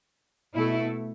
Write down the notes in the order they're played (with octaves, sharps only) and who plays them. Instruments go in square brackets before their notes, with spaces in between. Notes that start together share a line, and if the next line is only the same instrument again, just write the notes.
[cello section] B2 A3 E4 A4